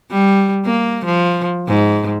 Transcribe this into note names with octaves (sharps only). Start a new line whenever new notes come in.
G3
A#3
F3
G#2